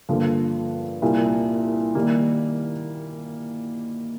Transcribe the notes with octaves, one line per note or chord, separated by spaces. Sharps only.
G2 D3 F3 A#3
C2 A#2 G3
D#3 G3 A#3